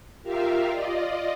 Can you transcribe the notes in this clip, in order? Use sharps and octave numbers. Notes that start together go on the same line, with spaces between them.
F4 G4 A#4 E5 F5
F4 D5 D#5